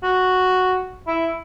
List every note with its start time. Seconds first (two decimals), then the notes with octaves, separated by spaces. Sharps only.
0.03 F#4
1.08 E4